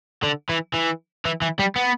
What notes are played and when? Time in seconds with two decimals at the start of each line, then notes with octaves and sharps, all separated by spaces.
0.23 D3
0.49 E3
0.74 E3
1.25 E3
1.42 E3
1.59 G3
1.76 B3